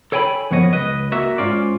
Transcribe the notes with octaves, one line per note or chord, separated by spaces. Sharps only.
A4 C#5 G5 G#5 A#5 B5
F#2 F3 B3 C#5 D#5
C#2 B4 D#5
A#3 F#4 E5
G#2 C#4 F4 D5